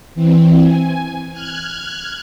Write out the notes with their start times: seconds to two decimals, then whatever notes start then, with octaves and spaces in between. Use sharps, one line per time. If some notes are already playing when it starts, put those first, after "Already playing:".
0.15 E3 C4
0.59 G#5
1.32 F6 F#6 G#6